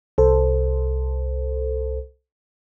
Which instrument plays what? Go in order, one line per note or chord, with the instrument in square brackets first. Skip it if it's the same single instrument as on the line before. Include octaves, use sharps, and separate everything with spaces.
[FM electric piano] C2 A4 C5